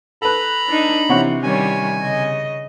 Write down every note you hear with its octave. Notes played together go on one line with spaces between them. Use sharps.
A4 B4 A#5 B5
D4 D#4
C3 E3 C#5 F#5
D#3 G3 C#4 G#5
C#3 D#5